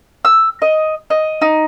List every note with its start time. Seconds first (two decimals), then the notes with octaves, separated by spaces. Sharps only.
0.25 E6
0.62 D#5
1.10 D#5
1.42 D#4